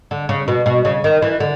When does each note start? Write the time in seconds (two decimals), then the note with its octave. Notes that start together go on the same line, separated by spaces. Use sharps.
0.11 D3
0.29 C#3
0.48 B2
0.66 B2
0.85 C#3
1.04 D#3
1.22 E3
1.40 D3